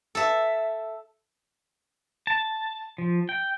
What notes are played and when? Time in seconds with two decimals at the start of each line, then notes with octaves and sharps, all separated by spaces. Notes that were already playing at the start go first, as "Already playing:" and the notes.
0.15 A4 E5
2.27 A5
2.98 F3
3.29 G5